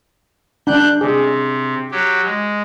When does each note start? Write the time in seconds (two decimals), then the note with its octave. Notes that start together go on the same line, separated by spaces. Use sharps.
0.67 D4 F#6 G6
1.01 C3 G#4
1.91 F#3 G4
2.24 G#3